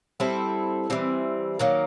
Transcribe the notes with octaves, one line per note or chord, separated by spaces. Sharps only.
G3 C4 E4 A4
E3 G3 C4
D#3 F#3 A#3